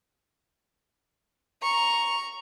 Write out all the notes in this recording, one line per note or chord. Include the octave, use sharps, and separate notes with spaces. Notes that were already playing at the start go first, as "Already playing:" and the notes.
A#5 C#6